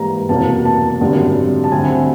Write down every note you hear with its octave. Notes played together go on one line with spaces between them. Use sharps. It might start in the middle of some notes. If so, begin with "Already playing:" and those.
Already playing: G#2 E3 G3 A#3 A#5
F1 E2 B2 F#3 A#3 A5
A5
G#1 F#2 D3 G3
A5
D2 D3 G3 C4 G#5